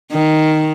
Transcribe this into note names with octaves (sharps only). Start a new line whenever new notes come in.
D#3